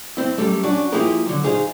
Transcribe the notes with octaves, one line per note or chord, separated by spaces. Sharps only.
C4 E4
F#2 G3 A3 A4
C#4 D4 F#4
F3 A#3 E4 G4 G#4 A#4
D3 F#3
D#4 G#4 C5 F5